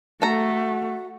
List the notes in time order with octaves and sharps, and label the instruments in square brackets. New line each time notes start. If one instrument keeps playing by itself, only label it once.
[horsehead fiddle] A3 [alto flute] F#4 [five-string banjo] A4 A#5